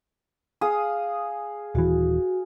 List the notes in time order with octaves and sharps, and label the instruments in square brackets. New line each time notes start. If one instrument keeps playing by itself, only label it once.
[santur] G#4 F5 D#6
[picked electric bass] D#1 E3 [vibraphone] F#4